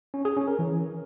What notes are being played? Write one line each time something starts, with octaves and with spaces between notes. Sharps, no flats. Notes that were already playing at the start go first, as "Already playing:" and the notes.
C#4
G#4
C#4
A#4
E3